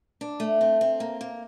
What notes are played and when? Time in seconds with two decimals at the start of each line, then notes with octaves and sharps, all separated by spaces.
0.21 D4
0.40 A3
0.61 C4
0.81 C4
1.00 A#3
1.21 A#3